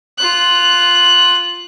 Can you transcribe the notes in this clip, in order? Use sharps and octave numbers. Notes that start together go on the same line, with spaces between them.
F4 F#6